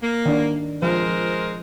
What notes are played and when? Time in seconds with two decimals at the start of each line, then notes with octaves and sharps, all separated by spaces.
0.02 A#3
0.26 D#3 D4
0.82 F3 G#3 A#4 C5